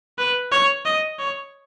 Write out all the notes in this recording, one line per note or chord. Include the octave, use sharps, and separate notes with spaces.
B4
C#5
D#5
C#5